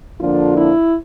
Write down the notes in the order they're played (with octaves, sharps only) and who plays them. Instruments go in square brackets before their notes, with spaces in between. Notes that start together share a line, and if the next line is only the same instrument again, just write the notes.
[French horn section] F2 D3 F3 A#3 D4 F4
E4